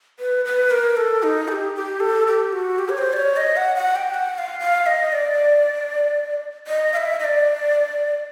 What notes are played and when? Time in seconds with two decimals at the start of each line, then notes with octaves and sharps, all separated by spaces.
0.19 B4
0.45 B4
0.71 A#4
0.97 A4
1.23 D#4
1.48 A4
1.52 G4
1.75 G4
2.00 A4
2.27 G4
2.53 F#4
2.79 G4
2.89 C#5
2.98 C5
3.13 D5
3.17 C#5
3.37 D#5
3.57 F#5
3.76 F#5
3.96 G5
4.14 F#5
4.34 F#5
4.38 F5
4.60 F5
4.86 D#5
5.12 D5
6.67 D#5
6.93 F5
6.97 E5
7.20 D#5
7.24 D5